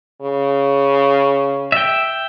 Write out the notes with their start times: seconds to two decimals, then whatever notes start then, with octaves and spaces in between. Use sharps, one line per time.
0.22 C#3
1.72 E5 G5